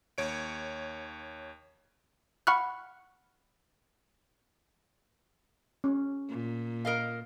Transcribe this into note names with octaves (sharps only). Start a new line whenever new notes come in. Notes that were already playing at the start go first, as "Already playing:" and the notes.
D#2 C#5 D7
F#5 B5 C#6 F6 F#6
C#4
A#2
A#4 D#5 F5